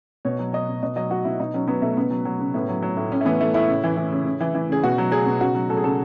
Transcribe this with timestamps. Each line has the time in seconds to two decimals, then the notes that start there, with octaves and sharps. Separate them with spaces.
0.25 B2 C#5
0.39 F#3
0.53 F#3 D#5
0.68 B2
0.83 B2 D#5
0.96 F#3 D#5
1.10 F#3 F#4
1.25 B2 E4
1.40 B2 D#4
1.54 F#3 C#4
1.68 F#3 B3
1.82 B2 A3
1.97 C#3 B3
2.11 F#3
2.25 F#3
2.39 C#3
2.54 A2 B3
2.69 F#3
2.82 F#3
2.97 A2
3.12 A2 C#4
3.21 A3
3.25 E3 B3
3.40 E3 A3
3.54 A2 E4
3.68 C#3
3.84 E3
3.97 E3
4.12 C#3
4.26 C#3
4.41 E3
4.55 E3
4.69 C#3 G#4
4.84 B2 F#4
4.98 F#3
5.11 F#3 G#4
5.26 B2
5.41 C#3 F#4
5.55 F#3
5.70 F#3 A4
5.77 G#4
5.83 C#3 A4